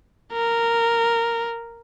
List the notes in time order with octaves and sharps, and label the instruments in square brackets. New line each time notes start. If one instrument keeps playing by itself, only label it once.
[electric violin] A#4